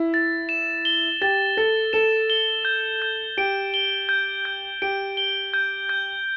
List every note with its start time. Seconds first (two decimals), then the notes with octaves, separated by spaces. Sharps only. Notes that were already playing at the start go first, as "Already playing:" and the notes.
Already playing: E4
0.14 A6
0.49 E7
0.85 G7
1.21 G4 A6
1.57 A4 A6
1.93 A4 E7
2.30 G7
2.65 G6
3.02 G6
3.37 G4 D7
3.74 G7
4.09 G6
4.45 G6
4.82 G4 D7
5.17 G7
5.54 G6
5.89 G6